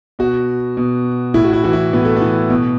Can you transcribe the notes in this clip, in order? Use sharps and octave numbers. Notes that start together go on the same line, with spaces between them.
B2 F#4
B2
A2 E4
F#4
E4
E3 F#4
E4
A2 B3
A3
B3
E3
B2